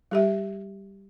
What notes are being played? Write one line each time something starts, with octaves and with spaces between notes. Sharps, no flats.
G3 G4 E5